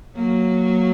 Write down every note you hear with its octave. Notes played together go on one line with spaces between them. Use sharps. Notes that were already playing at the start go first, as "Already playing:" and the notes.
F#3 A#3